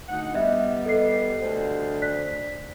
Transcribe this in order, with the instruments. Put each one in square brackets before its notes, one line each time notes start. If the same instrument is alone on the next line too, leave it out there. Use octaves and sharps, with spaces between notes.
[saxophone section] D2 D#4 F#5
[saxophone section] G3 B3 [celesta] D#5 E5
[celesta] A4 D#5 C7
[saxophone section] D2 D3 C5
[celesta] D5 F#6 B6